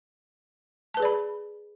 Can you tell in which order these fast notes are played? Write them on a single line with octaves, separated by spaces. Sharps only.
A5 B4 G#4 D5 B5